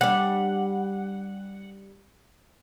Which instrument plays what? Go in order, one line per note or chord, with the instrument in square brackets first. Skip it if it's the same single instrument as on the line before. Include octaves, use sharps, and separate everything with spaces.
[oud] G3 D4 [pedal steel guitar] F#5